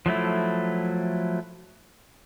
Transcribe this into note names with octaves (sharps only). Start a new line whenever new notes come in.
F3 F#3 A3 E4